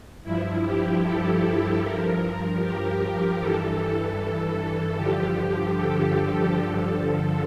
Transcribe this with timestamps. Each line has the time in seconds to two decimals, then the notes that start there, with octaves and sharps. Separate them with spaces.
0.24 G2 F3 E4
0.64 G4
1.03 A4
1.82 G2 F3 A#4
2.60 G4
3.40 G2 E3 A4
4.97 G2 D3 F3 G4
5.75 A4
6.54 G2 D3 F3